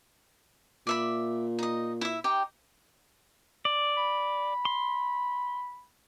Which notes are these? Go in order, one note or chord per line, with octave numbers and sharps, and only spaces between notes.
A#2 D5 E5 B5
D#4 D#5
E4 E5
D#4 G4 G5
D5
B5
C6